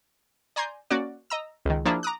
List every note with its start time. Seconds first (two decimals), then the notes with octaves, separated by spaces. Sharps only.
0.56 D5 G#5 A#5 C6 G6
0.90 A#3 C#4 F#4 D5
1.30 D#5 A#5 E6
1.65 C#2 D#3
1.85 F3 A#3 D4 E4 G#4
2.03 A#5 D6 D#6 F#6